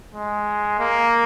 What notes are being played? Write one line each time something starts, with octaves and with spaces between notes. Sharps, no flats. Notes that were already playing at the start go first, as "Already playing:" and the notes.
G#3
A#3